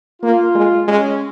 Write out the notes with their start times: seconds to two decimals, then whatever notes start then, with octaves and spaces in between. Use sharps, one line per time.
0.22 A#3 F4
0.55 G#3
0.87 G#3 C#4